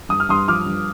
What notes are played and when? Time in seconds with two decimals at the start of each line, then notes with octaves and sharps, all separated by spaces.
0.09 G2 D#6
0.20 F6
0.29 G2 C6 D#6
0.48 F3 D6 F6
0.66 G2